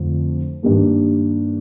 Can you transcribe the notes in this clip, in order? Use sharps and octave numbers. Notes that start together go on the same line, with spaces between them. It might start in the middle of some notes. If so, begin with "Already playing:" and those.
Already playing: F2 D3 F3 A3
G2 D#3 G3 A#3